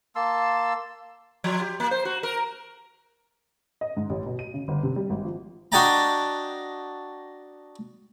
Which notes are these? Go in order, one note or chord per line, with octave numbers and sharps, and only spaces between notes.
A#3 A5 C6 E6
F3
G4
A#3
C5
F#4
A#4
D#5
G#2
A1
B2
D#7
C#3
G1
C3
G3
G#1
F3
D4 F#4 D#5 G5 A5 A#5